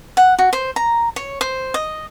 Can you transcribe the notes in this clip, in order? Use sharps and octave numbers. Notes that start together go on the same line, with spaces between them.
F#5
F#4
C5
A#5
C#5
C5
D#5